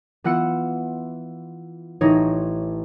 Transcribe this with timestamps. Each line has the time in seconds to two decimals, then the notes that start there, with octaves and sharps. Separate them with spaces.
0.24 E3 B3 F4 F#5 E6 C#7
2.01 A1 E3 D#4 C#5 A#6